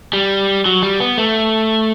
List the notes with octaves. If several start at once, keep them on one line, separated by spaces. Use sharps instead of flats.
G3
F#3
G3
B3
A3